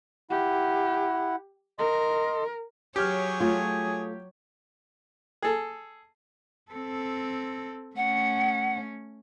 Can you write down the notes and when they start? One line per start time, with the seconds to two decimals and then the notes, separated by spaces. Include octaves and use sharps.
0.30 E4 G4 F#5
1.79 A#4 D#5 C6
2.96 F#3 G4 G#4 C#5 F6
3.40 A3 F4 G#4
5.42 G#4 A4
6.71 C4 A4
7.96 A3 C#4 F#5